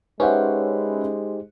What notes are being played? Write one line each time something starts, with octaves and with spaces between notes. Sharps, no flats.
G#3 C#4 D#4 G4 B4 C5 E5 F#5